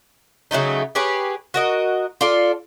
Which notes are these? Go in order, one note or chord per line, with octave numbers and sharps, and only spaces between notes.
C#3 F#3 A3 D#4
G4 G#4 B4 C#5
F#4 A#4 D#5
F4 A4 D5